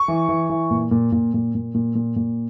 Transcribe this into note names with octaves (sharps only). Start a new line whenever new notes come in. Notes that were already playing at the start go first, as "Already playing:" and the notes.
Already playing: C#6
E3
E3
E3
A#2
A#2
A#2
A#2
A#2
A#2
A#2
A#2